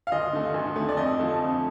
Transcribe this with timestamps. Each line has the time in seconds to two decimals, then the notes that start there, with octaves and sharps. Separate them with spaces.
0.07 F5
0.12 D2 D#5
0.33 D3 A3
0.54 D2
0.76 D3 A3
0.89 D5
0.97 F2 D#5
1.19 D3 F3 A3
1.40 F2